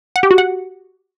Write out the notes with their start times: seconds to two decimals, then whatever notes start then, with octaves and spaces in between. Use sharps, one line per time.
0.16 F#5
0.23 G4
0.31 F#4
0.38 F#5